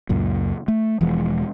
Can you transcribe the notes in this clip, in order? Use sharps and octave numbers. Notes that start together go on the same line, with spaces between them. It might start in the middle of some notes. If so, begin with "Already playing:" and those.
C#2 F#2 A#2
A3
E1 E3 F3 G#3